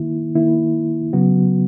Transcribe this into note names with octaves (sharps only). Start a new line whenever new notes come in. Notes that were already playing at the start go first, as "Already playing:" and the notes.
Already playing: D#3 A#3 E4
D#3 A#3 E4
C#3 F#3 B3 F#4